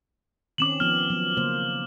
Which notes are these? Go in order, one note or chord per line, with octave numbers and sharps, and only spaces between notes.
D#3 C4 C#4 D6 E7 F#7
F3 B3 F6
F3 F#3 B3
C#3 A#3 C5